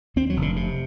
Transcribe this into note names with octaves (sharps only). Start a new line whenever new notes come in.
D#2 C4
F#3
F1
D3
C3